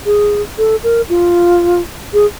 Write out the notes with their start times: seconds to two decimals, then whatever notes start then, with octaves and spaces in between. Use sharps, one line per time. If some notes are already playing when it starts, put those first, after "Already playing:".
0.06 G#4
0.58 A4
0.84 A#4
1.09 F4
2.14 G#4